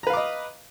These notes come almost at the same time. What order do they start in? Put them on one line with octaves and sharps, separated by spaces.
A#5 B4 F5 D6 D#5